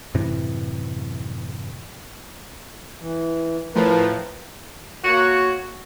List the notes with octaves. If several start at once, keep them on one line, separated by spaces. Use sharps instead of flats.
F#2 A2 C3 E3
E3
A2 F3 A#4 B4
A#3 F#4 C#5